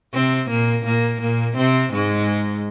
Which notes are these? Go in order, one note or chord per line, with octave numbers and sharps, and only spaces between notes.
C3 C4
A#2 A#3
A#2 A#3
A#2 A#3
C3 C4
G#2 G#3